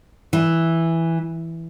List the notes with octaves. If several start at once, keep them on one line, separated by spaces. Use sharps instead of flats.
E3